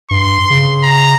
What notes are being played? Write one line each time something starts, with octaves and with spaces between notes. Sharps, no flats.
G2 C6
C#3
A#5